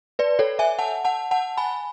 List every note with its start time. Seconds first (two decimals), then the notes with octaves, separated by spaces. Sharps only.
0.19 B4 D5
0.39 A4 C#5
0.59 E5 G#5
0.79 F#5 A5
1.05 F#5 A5
1.31 F#5 A5
1.57 G#5 B5